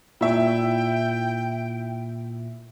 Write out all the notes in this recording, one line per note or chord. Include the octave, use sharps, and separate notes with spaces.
A#2 E4 E5 G5